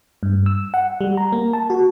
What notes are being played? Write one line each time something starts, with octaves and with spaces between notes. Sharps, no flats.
G2
E6
F#5
G3
A#5
A#3
A5
F#4